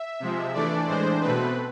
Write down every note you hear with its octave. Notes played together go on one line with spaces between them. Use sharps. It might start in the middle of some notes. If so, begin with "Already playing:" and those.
Already playing: E5
C3 F3 G#3
E3 A3 D4 D5
A2 E3 G#3 D4 C5
B2 A3 C4 B4